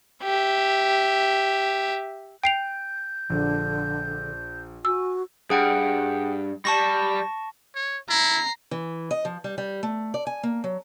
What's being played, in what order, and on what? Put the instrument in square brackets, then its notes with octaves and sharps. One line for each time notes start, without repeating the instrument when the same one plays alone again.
[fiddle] G4 E5
[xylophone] G5 C7 F7 [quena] G6 [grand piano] D7
[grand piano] A#1 [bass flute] D3
[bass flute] F#4 [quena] G#5 [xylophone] E6
[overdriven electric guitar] G2 [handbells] G#4 F#5 G5
[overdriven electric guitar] G3 [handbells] A5 C#6 A#6
[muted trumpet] C#5
[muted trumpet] E4 [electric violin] A#5 C7
[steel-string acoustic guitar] E3
D#5
F3
G3
G3
A3
D5
G#5
A#3
F#3